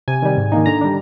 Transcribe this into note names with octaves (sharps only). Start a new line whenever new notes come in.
C3 G#5
D#3 G3
G#2
D#3 A#3 D#4
D3 A#5
G3 D4